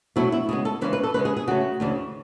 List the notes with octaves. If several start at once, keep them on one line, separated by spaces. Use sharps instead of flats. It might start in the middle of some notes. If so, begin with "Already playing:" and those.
B2 F#3 A3 E4
E4
C#3 G#3 B3 G#4
A4
C#3 E3 G#3 C#4 B4
B4
A4
C#3 G#3 C#4 B4
G#4
G#4
C#3 F#3 A3 F#4
D2 C#3 E3